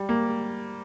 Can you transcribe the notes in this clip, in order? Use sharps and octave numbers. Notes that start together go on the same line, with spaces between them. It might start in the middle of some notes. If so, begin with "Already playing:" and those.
Already playing: G3
A#3